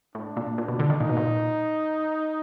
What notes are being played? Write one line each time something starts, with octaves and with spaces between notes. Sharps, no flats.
A2 D4
A#2
A#2
B2
D3
D#3
A#2 D#4
B2
A#2